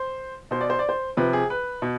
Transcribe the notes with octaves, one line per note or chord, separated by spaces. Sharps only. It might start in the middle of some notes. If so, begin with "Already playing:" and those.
Already playing: C5
B2 C5
D5
C5
D5
C5
C3 F3 B4
G#4
B4
B2